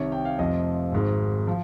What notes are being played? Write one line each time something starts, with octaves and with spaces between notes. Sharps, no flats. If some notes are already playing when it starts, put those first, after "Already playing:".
Already playing: C2 C3 D#3 C#5
G5
F5
F1 F2 C3 F3 D#5
G#1 G#2 D#3
F3